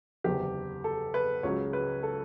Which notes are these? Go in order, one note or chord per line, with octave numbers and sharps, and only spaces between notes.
F#1 E2 D3 G4
A4
B4
C#2 C#3 F#3 C#5
B4
A4